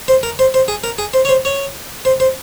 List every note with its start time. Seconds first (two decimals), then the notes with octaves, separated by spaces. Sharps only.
0.08 C5
0.23 A#4
0.39 C5
0.54 C5
0.68 G#4
0.84 A#4
0.98 G#4
1.14 C5
1.25 C#5
1.29 C5
1.45 C#5
2.05 C5
2.20 C5